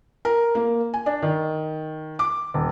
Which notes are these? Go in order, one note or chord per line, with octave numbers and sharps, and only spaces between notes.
A#4
A#3
G#5
D4
D#3
D6
D#1